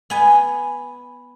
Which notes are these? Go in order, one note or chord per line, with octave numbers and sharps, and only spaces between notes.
B3 G#5